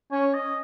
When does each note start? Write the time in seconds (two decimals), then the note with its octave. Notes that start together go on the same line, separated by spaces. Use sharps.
0.12 C#4 C#5
0.33 D#5